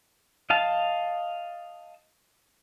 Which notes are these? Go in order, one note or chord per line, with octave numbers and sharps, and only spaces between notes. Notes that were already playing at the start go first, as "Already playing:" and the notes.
D#5 F5 A5